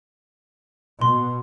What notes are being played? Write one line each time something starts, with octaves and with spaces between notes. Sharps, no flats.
B2 C6